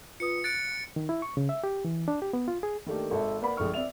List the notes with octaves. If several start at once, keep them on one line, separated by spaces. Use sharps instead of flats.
F4 B4 D#6 C#7
F#6 A6 C#7 D7
D#3
E4
C#6
C#3
E5
G4
E3
D4
G4
B3
F4
G#4
D#3 A3 A#3 D4 G4
G#1 A4 E5
A#3 B4 D5 F#5 B5
A#1 D3 G#3 A3 C#6 F6
C4 D5 E5 F7